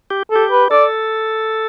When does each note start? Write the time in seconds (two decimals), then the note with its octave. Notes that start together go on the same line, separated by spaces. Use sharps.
0.10 G4
0.31 A4
0.36 G4
0.51 B4
0.71 A4 D5